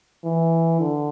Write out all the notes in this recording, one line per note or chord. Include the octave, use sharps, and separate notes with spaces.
E3
D3